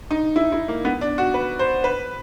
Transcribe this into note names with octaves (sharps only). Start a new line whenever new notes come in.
D#4
E4
E4
A#3
B3
D4
F#4
B4
C5
B4